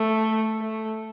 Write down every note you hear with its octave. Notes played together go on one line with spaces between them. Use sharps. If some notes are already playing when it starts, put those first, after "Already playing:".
Already playing: A3
A3